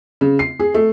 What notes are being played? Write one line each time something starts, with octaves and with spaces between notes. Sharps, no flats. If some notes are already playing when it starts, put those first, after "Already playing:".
C#3
C7
G#4
A3